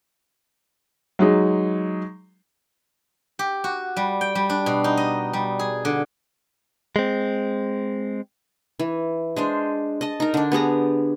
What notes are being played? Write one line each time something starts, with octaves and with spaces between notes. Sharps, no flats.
F#3 G#3 D#4
G4
F#4
G3
G5
G3
D4
B2
D#4
D#5
G3
G#4
D3
G#3 C4
E3
G#3 D4 C5
D#5 A5
D#4 A#4
D3 D4
B3 G4 G#4 A#5